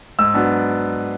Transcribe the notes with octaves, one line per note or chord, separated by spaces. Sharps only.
G#2 E6
F#3 B3 D4